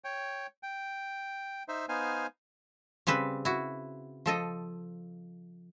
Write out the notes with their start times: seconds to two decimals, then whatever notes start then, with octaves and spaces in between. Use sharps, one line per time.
0.04 C#5 G5
0.63 G5
1.68 D#4 C5 E5
1.89 B3 D#4 C5 F5 G#5
3.07 C#3 G3 C4 B4
3.45 E4 F#4
4.26 F3 A4 D#5